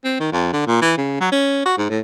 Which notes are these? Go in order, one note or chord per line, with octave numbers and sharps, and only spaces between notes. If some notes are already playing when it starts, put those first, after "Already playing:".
C4
D#3
F2
D3
A#2
E3
C#3
F#3
C#4
F#4
G#2
A2